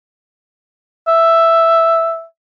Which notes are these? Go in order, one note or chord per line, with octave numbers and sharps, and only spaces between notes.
E5